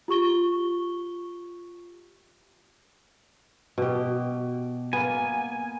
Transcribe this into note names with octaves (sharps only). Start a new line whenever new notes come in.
F4 G4 C#6 G7
B2 G4
A#3 B3 G#5